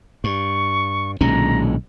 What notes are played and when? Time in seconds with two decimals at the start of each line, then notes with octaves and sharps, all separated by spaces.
0.24 G2 C#6
1.21 B1 A#2 D3 D#3 G#3 C#4 A#5